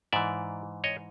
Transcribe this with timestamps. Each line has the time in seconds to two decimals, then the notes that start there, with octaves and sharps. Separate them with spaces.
0.13 G#2 E3 D5 E5
0.84 C#5 D#5